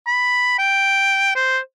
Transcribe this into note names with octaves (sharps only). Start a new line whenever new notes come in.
B5
G5
C5